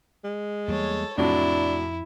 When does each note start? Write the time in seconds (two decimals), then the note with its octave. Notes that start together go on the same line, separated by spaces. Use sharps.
0.24 G#3
0.68 E2 G3 A#3 A4 C#5
1.18 F2 A2 C3 F#3 D4 E4